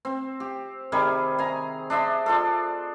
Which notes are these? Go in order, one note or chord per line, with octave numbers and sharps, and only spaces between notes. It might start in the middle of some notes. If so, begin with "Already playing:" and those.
C4
G4
C3 D#3 G3 G#4
G#5 A#5
D4 D#5 E5 C6
D4 F4 A4